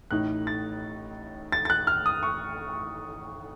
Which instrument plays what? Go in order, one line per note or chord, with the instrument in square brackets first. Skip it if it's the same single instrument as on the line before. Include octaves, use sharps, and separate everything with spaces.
[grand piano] A1 A2 A3 D#4 F#6
A6
A6
A6
F#6
F6
D#6
C#6